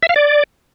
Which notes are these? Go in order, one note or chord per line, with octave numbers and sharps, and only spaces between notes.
E5
F5
D5